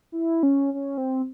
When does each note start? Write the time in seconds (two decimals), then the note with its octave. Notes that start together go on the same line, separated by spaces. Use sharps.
0.12 E4
0.43 C#4
0.74 C#4
0.98 C4